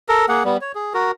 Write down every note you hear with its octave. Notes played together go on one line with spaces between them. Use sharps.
A4 A#4
A#3 G#4 F#5
G3 B3
C#5
G#4
F#4 A#4